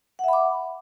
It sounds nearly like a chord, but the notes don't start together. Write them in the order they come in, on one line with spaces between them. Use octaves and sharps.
F#5 E5 B5 D6